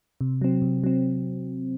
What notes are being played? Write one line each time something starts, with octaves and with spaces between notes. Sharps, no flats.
C3
F#3 C4
C3
F#3 C4